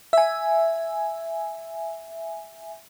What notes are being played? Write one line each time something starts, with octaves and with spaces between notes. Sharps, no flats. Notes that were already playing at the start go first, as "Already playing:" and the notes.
E5 G#5